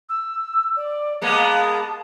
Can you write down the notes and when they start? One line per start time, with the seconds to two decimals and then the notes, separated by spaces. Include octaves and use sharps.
0.09 E6
0.76 D5
1.22 G#3 A#3 B3 A5